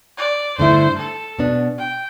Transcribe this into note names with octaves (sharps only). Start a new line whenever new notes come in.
D5
G2 D3 A3 E4 C5
A4
B2 B3 D4
G5